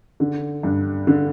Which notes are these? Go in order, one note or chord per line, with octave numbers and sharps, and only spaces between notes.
D3
G2
D3